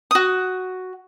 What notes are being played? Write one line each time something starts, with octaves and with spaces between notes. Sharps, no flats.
F#4 D#6